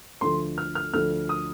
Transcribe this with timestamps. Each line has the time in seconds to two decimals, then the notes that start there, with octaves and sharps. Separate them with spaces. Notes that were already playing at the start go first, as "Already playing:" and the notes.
0.21 D2 D3 F3 A3 C6
0.58 F6
0.75 F6
0.93 D2 D3 F3 A3 F6
1.29 D#6